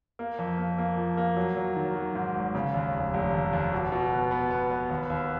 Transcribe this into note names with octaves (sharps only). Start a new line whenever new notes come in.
A#3
F2
A#3
A#3
F3
A#3
F#3
F#3
D#3
F#3
G#2
G#1
C#3
D#2
F1
F1
D#2
D#2
B2
B2
B3
B3
B3
B3
D#2
D#2